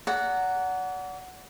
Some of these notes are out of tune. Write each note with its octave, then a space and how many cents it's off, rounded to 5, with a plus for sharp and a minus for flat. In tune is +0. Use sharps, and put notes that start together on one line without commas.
D5 -40 F#5 +0 A#5 -20